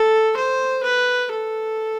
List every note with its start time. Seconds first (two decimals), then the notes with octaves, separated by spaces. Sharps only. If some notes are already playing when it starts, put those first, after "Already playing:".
Already playing: A4
0.36 C5
0.83 B4
1.30 A4